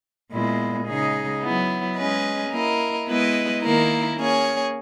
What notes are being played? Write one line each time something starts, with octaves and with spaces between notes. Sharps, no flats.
A#2 G#3 B3 E4
C#3 G#3 D#4 G#4
F#3 B3 E4
G#3 C#4 G#4 B4 D#5
A#3 E4 A#4 D#5
G#3 B3 E4 B4 D#5
D#3 A#3 E4 A#4
A#3 C#4 G#4 C#5